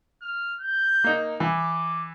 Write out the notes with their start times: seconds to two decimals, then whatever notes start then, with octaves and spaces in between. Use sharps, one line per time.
0.21 F6
0.60 G6
1.04 A#3 D#4
1.40 E3 D6